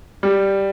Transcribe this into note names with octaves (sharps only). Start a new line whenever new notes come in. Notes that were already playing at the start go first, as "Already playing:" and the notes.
G3